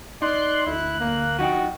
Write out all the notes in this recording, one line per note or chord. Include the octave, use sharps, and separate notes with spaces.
D#4 D5 C6 F#6
D2 E4 F#6
A#2 A#3
F3 D#4 F#4 G5